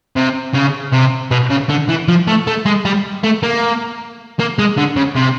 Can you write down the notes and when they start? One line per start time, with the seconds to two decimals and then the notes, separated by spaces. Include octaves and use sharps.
0.16 C3
0.54 C#3
0.93 C3
1.31 B2
1.50 C#3
1.69 D3
1.89 E3
2.08 F3
2.27 A3
2.47 A3
2.66 G#3
2.85 G3
3.23 A3
3.43 A#3
4.39 A#3
4.59 G#3
4.78 D3
4.97 C#3
5.16 C3